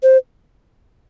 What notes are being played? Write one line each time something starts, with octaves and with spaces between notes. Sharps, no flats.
C5